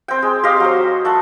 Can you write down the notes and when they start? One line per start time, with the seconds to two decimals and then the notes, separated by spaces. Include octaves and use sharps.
0.08 C4 G5
0.23 G#3
0.43 G4 D#5 F5
0.60 F#3 C5
1.05 A3 A4 F#5